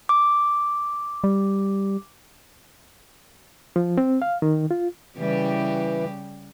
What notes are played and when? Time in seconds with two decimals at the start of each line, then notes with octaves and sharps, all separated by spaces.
0.09 D6
1.24 G3
3.76 F3
3.98 C4
4.22 F5
4.42 D#3
4.71 F4
5.18 C#3 E3 G3 G4